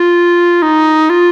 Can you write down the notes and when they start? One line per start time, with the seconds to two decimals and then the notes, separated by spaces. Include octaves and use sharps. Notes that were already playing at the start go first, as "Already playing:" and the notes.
Already playing: F4
0.62 D#4
1.10 F4